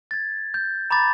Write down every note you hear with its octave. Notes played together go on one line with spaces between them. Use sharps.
G#6 A6
G6
A#5 B5 D6 A6